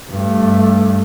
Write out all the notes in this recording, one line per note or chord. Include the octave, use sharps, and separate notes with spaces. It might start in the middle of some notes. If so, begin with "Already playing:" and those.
G2 A3